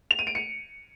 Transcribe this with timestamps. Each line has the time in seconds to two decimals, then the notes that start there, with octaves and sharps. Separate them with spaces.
0.11 F7
0.19 D#7
0.27 D7
0.35 C#7